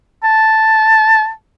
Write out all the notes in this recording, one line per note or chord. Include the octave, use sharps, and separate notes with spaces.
A5